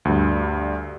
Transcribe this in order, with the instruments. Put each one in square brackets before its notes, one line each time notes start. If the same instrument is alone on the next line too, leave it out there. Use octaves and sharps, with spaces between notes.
[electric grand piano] D2 G2